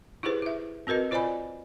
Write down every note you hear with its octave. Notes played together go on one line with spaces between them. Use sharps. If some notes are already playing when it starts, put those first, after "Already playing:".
D#4 E4 G4 G#4 B4 C5
E4 E5
C4 F#4 A#4 B4 D#5
F4 C5 D5 D#5 G#5 B5